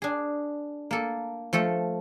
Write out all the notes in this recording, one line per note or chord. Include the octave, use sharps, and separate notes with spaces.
D4 G#4
A#3 A4
F3 A3 A4